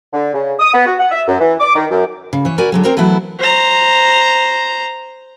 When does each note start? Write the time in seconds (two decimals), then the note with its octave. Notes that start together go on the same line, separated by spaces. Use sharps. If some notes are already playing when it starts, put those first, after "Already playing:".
0.13 D3
0.34 C#3
0.59 D#6
0.74 B3
0.86 F#4
0.99 F#5
1.11 E5
1.28 F#2
1.40 E3
1.60 D6
1.76 D#3
1.91 F#2
2.33 C#3
2.45 E3 C#5
2.58 F#4 A#4 B4 D5 G#5
2.72 D3 F#3 G#3
2.83 C4 A#4 C5 C#5 A#5
2.97 E3 F#3 A3 B3 E4 F#4
3.39 C5 A#5